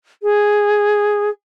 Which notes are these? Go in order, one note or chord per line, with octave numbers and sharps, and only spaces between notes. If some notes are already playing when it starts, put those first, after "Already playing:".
G#4